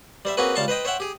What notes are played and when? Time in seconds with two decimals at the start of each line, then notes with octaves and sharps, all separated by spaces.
0.25 G3 C5 E5
0.37 A#3 C4 C#4 F#4 G#4 B4
0.56 C#2 G3 F5 A5 C6 C#6
0.68 B4 C5 D#5 G5
0.85 C5 C#5 E5 F#5 G5
1.00 G4 G#4